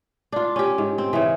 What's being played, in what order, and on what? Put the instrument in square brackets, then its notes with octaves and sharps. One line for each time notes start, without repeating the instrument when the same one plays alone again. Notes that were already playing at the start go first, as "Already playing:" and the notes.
[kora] D4 F4
C#4 G4
G#2
C4
C#3 E3